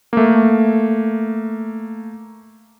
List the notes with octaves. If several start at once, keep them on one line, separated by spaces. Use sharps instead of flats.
A3 A#3